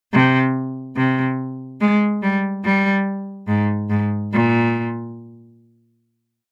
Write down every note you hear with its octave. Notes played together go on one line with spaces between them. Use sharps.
C3
C3
G#3
G3
G3
G#2
G#2
A#2